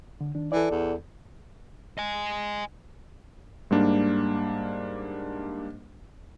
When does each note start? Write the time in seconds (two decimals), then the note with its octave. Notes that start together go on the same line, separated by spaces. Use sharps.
0.21 D3
0.35 D#3 D4
0.52 E3 A4 D5
0.71 E2
1.98 D#5 G#5
3.71 G#2 G3 A#3 D4